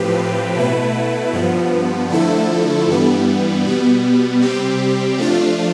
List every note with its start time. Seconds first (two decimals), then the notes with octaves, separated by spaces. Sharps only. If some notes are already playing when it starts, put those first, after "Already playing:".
Already playing: A2 F3 C4 G4 B4
0.56 B2 A3 E4 B4
1.33 G2 F3 B3
2.10 D3 F3 A3 E4 A4
2.88 G2 E3 G3 B3
3.64 B2 G3 B3
4.41 C3 G3 C4 G4
5.18 F3 A3 D4 F4